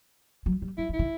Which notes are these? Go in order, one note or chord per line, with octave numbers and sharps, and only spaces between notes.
F#3
G3
F#3 E4
E3
E4
D#3